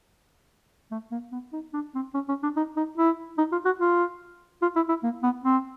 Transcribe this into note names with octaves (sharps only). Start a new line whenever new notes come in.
A3
A#3
B3
D#4
D4
C4
C#4
C#4
D4
D#4
D#4
E4
D#4
F4
F#4
F4
F4
E4
E4
A#3
B3
C4